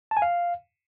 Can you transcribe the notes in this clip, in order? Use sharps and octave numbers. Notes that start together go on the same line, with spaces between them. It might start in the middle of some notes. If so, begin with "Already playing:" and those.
A5
G#5
F5